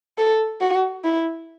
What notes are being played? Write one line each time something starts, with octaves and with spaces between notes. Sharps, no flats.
A4
F#4
E4